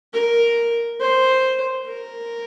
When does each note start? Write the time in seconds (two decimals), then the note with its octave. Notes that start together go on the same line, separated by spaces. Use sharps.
0.14 A#4
1.00 C5
1.87 A#4